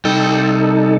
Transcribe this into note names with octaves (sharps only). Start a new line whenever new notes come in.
C3 G3 D#4 A4 G5